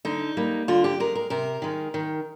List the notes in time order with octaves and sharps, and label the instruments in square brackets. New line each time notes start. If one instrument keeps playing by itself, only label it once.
[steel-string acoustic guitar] D3 D#4
G3 A#3
D3 F4
G4
G#3 A#4
A#4
C3 A#4
D#3 G#3
D#3